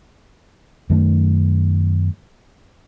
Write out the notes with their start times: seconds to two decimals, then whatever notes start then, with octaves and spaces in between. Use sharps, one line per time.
0.90 F#2 D#3 A3